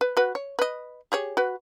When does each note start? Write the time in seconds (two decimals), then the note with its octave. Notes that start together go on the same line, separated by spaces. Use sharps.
0.01 B4
0.17 F#4 B4
0.35 C#5
0.59 B4 D#5
1.12 G4 G#4 C#5
1.37 F#4 B4